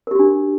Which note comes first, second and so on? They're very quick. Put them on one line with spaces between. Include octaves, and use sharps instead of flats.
A#4 G4 F#4 D4